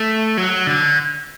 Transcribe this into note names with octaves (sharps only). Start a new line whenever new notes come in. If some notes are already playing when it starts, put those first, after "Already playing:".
Already playing: A3
F#3
D3